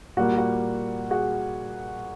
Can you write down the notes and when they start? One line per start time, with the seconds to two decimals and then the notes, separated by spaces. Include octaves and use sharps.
0.17 A#2 G3 A#3 F#4
0.37 F#4
1.10 F#4 G#4